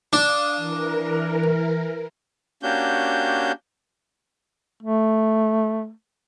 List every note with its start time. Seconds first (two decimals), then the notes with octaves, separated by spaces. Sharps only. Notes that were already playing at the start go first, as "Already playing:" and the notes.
0.13 D4 F5 D#6
0.56 E3 A#4
2.63 A#3 C#4 D4 F#4 G4 G6
4.83 A3